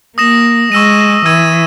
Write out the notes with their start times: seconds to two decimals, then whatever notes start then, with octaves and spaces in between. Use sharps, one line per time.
0.18 A#3 D#6 A#6 E7
0.71 G#3 C#6 E6 A#6 D#7
1.25 E3 E6 G#6 D#7